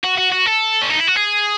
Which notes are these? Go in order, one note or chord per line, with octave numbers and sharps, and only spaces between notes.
F#4
F#4
F#4
A4
C#4
D#4
E4
F#4
G#4